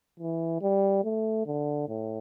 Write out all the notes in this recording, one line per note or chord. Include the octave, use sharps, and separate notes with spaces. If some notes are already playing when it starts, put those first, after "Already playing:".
E3
G3
A3
D3
A2